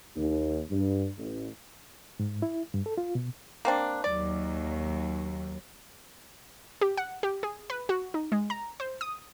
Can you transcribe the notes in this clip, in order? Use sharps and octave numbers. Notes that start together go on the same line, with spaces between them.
D#2
G2
A1
G#2
E4
G2
A4
F4
B2
A#3 C4 D4
D#2 F#3 D5
G4
F#5
G4
G#4
B4
F#4
D#4
G#3
A#5
C5
D#6